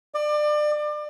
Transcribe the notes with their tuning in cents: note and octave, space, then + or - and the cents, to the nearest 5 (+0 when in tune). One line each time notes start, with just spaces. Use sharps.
D5 +30